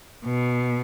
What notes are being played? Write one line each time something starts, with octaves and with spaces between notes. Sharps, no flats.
B2